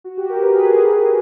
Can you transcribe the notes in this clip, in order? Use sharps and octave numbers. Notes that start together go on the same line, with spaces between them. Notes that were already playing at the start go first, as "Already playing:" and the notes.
F#4
G4
A#4
B4
G#4